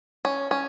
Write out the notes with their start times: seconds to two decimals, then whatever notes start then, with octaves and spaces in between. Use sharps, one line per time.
0.25 C#4
0.51 C#4